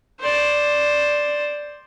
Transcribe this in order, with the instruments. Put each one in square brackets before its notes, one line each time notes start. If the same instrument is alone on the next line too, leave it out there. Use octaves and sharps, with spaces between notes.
[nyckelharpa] C5 D5